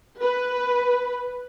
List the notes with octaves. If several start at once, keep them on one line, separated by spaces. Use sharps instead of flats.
B4